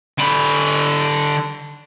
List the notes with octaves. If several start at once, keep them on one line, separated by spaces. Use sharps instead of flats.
D3 B5